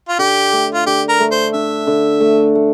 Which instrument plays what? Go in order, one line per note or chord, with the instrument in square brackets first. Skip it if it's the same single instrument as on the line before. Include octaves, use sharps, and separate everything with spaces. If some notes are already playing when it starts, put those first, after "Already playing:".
[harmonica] F4
[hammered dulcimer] D3 [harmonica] G4
[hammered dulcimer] A3
[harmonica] F4
[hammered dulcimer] D3 [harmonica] G4
[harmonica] A#4
[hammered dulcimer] A3
[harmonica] C5
[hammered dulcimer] D4 [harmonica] E5
[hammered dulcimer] D3
A3
A3